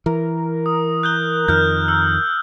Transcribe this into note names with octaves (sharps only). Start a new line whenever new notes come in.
E3 A#4
D#6
F#6 G6 G7
F2 D#3 F6 G6
E6